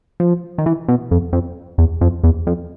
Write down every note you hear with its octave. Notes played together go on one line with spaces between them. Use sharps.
F3
D#3
E3
B2
F2
F2
E2
F2
E2
F2